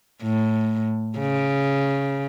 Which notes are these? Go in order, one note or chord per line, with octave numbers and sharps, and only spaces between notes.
A2
C#3